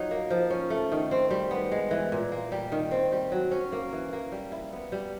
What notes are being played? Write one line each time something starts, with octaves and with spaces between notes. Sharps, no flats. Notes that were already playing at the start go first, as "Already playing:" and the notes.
Already playing: F3 F#3 D#4
A#3
F3
C#4
A3
D#3
C4
G3
B3
G#3
E3
A#2
A#3
G3
D#3
C4
G3
F#3
C#4
A#3
E3
A#3
G3
E4
B3
G3